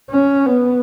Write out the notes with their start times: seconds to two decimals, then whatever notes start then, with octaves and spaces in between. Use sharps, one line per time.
0.10 C#4
0.46 B3